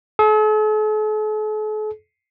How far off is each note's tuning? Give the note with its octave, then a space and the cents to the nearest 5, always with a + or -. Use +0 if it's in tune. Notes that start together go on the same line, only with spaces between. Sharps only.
A4 -45